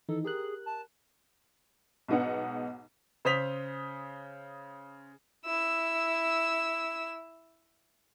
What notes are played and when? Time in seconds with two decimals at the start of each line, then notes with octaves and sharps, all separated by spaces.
0.09 D#3 E3 D#4 A4
0.24 G4 G#4 A#4 F#6
0.66 A5
2.08 B1 G#2 B3 D#4 F#5
3.25 C#3 C5 D#6 B6 F7
5.45 E4 E6